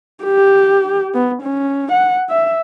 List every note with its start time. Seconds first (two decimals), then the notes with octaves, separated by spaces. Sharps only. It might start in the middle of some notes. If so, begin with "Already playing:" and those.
0.25 G4
1.14 B3
1.42 C#4
1.92 F#5
2.30 E5